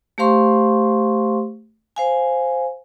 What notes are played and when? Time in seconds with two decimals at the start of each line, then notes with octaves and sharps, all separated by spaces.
0.18 A3 G4 C5 F5 C6 C#6
1.96 C5 F5 G#5